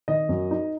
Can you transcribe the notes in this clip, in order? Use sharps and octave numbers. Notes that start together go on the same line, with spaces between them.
D#3 D#5
F#2
D#4